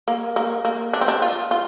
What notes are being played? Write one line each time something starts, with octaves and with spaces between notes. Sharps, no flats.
A#3
A#3
A#3
D4
C4
D4
F4
F4